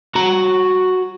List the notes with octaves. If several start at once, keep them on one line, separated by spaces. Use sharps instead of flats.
F#4 A#5